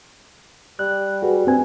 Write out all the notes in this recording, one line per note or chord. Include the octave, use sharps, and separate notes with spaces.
G3 F#6
F#4 G#4 B4
G2 C4 G#5